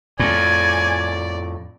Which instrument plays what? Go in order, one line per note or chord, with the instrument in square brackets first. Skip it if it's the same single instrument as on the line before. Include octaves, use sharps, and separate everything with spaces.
[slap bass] F2 A2 [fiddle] D5 [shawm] G#5